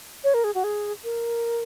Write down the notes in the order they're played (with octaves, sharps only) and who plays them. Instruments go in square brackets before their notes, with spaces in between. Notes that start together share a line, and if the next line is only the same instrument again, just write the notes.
[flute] C#5
A#4
G#4
F#4
G#4
A#4